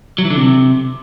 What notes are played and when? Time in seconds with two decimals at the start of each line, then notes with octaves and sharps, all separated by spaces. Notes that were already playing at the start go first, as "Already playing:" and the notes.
0.18 F#3
0.24 E3
0.30 D3
0.36 C3